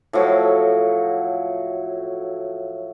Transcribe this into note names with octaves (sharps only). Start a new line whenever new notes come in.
A2 F3 F#3